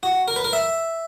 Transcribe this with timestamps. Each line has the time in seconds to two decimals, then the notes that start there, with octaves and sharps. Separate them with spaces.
0.03 F#4
0.28 A#4
0.36 B4
0.44 A#4
0.53 E5